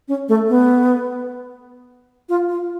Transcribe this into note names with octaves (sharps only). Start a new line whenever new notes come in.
C#4
A3
B3
F4
F4